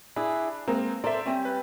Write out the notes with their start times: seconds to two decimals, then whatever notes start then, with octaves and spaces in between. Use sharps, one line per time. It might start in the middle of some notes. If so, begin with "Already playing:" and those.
0.16 D4 E4 G#4
0.67 G#3 A#3 C4 A#4
1.04 A4 A#4 C5 D5 E5
1.26 G3 C4 C#4
1.45 B4